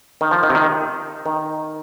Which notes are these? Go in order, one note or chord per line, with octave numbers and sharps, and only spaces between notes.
D#3
F3
D#3
C3
D#3
D#3